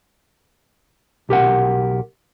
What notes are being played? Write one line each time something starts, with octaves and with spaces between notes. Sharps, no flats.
B1 G4 A#4 F#5